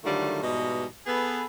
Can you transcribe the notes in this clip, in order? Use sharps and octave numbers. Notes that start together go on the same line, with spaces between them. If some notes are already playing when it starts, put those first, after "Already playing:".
D3 D#3 F#3 G3 A3 F4
G#2 B2 E3 G3 D#5
B3 G#4 A4 B4